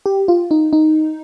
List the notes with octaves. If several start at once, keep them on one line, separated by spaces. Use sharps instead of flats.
G4
F4
D#4
D#4